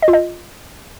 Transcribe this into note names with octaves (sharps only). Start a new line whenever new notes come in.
D#5
F4
D#5